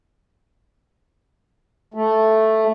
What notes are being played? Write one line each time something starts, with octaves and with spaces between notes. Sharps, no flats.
A3